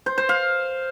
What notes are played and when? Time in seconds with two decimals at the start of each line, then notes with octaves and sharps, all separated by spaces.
0.06 C5
0.18 C5
0.29 F5